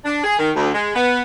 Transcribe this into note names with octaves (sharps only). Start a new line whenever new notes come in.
D4
G#4
D#3
D2
G#3
B3